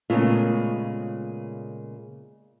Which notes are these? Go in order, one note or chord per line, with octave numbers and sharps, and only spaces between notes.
A#2 C#3 G#3 A3 B3 F4